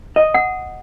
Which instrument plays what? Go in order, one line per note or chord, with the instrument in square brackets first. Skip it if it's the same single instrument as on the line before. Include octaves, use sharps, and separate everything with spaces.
[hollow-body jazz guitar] D#5
[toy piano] F#5